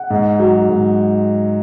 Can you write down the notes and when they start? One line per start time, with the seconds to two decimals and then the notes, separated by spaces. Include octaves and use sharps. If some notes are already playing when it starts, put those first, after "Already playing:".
Already playing: F#5
0.10 G#2
0.40 F#3
0.69 G#2